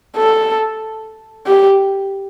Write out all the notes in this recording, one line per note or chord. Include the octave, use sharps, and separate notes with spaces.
A4
G4